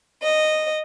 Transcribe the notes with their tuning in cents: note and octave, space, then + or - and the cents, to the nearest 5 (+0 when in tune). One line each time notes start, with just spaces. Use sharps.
D#5 -10